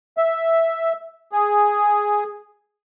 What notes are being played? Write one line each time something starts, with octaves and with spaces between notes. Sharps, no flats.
E5
G#4